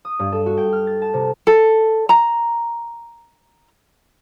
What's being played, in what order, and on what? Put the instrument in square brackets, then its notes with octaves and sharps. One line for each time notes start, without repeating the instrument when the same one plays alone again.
[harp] D#6
G2
A4
F#4
G5
F6
A6
A5
C3
[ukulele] A4
A#5